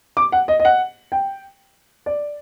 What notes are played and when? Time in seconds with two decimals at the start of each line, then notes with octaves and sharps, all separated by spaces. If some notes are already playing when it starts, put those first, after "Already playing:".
0.17 D6
0.32 F#5
0.48 D#5
0.60 D#5
0.65 F#5
1.12 G5
2.06 D5